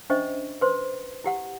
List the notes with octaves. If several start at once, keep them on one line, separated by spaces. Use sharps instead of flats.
C#4 D4 C5 D#5 E5 C#6
B4 C5 C6
E4 G4 F#5